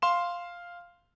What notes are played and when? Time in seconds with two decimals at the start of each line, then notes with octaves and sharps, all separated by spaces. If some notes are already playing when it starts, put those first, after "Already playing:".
0.02 F5 C6 E7